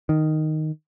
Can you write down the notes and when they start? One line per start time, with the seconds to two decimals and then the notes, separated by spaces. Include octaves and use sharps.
0.09 D#3